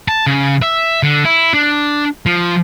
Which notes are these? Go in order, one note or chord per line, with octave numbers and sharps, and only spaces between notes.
A5
C#3
E5
D3
E4
D4
F3